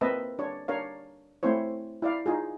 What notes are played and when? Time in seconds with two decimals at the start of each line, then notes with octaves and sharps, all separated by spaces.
0.01 A#3 C4 B4 D#5 E5 A5
0.39 D4 C#5
0.68 D4 A#4 C#5 F5
1.43 A3 C4 E4 C5 C#5
2.02 E4 D5 F5
2.26 D#4 F4 G#4